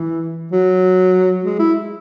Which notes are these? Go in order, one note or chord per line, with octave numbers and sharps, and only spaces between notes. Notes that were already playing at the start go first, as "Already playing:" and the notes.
Already playing: E3
F#3
G#3
E4